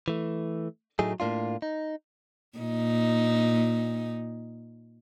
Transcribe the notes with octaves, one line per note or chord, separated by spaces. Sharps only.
E3 A3
A2 F#3 A3 D#4 G#4
A2 A#3 D4 F4
D#4
A#2 D#4